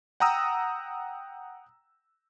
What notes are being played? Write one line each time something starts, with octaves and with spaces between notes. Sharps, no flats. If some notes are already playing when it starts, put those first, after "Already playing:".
F#5 G5 A#5 D#6 E6